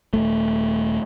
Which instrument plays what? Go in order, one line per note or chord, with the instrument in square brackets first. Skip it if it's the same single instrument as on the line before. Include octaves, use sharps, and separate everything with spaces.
[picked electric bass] D#1 F2 A3